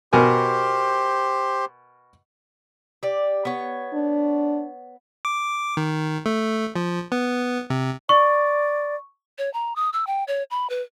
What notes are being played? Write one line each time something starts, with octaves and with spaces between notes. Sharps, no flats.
B2 G4 A#4 C5 G#5
G4 D5
B3 C#5
D4
D6
D#3
A3
F3
B3
C3
D5 C#6
C#5
A#5
D#6
E6
G5
C#5
B5
B4